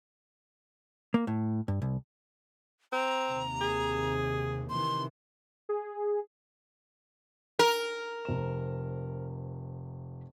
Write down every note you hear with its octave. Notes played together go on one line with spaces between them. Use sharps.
A#3
A2
G2
C2
C4 A#5
D#2 C3
G#4
C3 D#3 E3 C6
G#4
A#4
F1 C5 E7